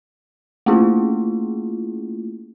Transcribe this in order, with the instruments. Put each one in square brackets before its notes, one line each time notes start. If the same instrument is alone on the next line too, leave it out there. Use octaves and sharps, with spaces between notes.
[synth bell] A3 A#3 C#4 E4 F4 G#4